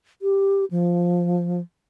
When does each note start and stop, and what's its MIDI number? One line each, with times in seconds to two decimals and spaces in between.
0.22 0.65 67
0.71 1.61 53